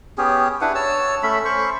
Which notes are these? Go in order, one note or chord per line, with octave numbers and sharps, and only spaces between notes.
B3 C#4 G4 G#4
D4 E4 B4 F#5
C#5 A5 E6
A3 C#4 E5 B5
C#4 C5 B5 C#6